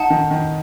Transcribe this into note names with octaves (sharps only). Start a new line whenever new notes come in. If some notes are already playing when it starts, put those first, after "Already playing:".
Already playing: D#4 F#5 A5
D#3
D#3